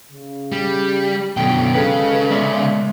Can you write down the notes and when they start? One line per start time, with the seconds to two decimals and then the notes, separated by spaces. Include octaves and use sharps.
0.11 C#3
0.52 G3
1.37 F#2 B2 D3 G5
1.74 G#1 C#3 G#3 A4 B4
2.30 A#2 G#3 D5 E5